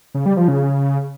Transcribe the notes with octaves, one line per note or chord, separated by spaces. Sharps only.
C#3
G3
F3
C#3